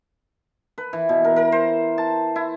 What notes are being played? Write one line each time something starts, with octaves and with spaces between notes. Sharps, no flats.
B4
E3
B2
A#4
A#4
C5
A5
E4